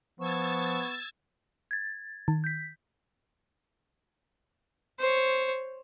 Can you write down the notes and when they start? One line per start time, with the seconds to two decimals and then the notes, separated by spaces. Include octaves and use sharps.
0.20 F3 B3 C#6 E6 G#6 A6
1.71 G#6 A6
2.28 D#3
2.44 G6 B6
4.99 C5 C#5